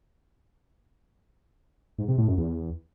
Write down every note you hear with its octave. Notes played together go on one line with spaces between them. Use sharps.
G#2
C3
A2
F#2
E2